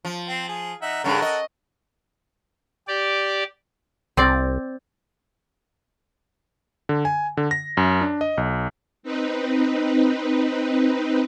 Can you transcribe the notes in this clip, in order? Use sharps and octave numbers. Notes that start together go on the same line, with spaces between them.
F3
C4
G#4
D#4 E5 F#5
G2 C#3 A4 A#4 F#5
D#5
G4 D5
C2 C4 D5
D3
G#5
D3
A#6
F#2
D4
D#5
B1
C4 D#4 B4